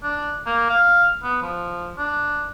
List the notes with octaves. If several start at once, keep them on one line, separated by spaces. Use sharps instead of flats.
D4
A#3
F5
B3
F3
D4